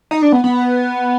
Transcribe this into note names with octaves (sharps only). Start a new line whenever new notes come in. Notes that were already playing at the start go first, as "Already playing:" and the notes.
D#4
D4
B3
B3